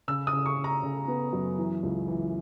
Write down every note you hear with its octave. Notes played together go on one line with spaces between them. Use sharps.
C#3 E6
D#6
C#3
C#6
C#3
A#5
C#3
B3
F#2
E3
C#2
E3